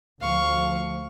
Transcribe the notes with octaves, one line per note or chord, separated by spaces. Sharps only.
D2 F3 F5 C#6